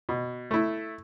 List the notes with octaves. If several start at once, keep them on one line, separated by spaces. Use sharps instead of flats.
B2
A3 E4